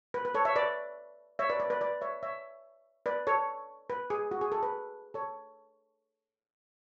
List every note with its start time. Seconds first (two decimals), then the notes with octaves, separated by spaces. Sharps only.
0.14 B4
0.25 B4
0.35 A4 C#5
0.45 C#5 E5
0.56 B4 D5
1.39 C#5 E5
1.49 B4 D5
1.60 B4 D5
1.70 B4 D5
1.81 B4 D5
2.01 C#5 E5
2.23 C#5 E5
3.06 B4 D5
3.27 A4 C#5
3.90 B4
4.10 G#4
4.31 F#4
4.41 G#4
4.52 A4
4.63 B4
5.14 A4 C#5